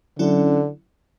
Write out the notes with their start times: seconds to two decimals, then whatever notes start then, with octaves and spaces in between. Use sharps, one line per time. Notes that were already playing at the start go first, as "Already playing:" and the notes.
0.19 D3 F#3 C#4 E4